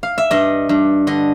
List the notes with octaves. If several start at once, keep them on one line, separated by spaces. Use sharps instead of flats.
F5
E5
G2 D#5
G2
D3 D#5